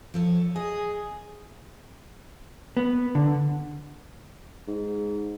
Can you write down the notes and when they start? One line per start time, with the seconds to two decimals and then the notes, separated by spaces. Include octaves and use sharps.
0.14 F3 A4 C#5
0.56 G#4 D#5
2.77 B3
3.15 D3
4.67 G#2